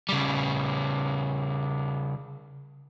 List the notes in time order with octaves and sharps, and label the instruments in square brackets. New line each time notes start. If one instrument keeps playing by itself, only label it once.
[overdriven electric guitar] C#3 G3